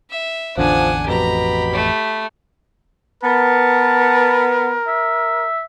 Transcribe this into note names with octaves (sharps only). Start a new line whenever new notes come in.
E5
A1 E2 D3 F3 D4 F#5 G#5
A1 F2 B2 G4 A#5 B5
A3
B3 A#4 A5
E5